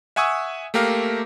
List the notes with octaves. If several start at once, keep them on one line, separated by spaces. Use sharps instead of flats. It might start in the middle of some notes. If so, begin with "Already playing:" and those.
E5 F#5 G#5 C#6 D#6 E6
A3 A#3 G4 A#4 F5